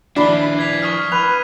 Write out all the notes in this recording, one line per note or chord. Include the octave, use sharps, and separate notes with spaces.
F3 D4 E4 B5 C7 G7
G#6 B6 F7
C#6 D#6 F6
B4 F6 D#7 F7